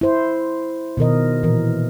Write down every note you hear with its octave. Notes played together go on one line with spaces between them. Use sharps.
E4 C5
B2 D#3 A#4 D#5
A#2 E3 A#4